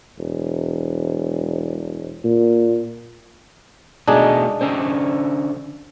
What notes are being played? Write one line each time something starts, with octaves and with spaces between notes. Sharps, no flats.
E1
A#2
B2 G#3 A3 D4 D#4 G#4
D3 C#4 C5